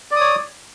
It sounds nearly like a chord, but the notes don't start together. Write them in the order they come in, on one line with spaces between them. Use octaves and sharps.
D5 D#6 C#5